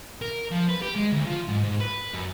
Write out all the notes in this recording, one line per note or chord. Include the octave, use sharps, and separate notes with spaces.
A#4
F3
B4
G4
G#3
D2
F3
G#2
G#2
B4
F#2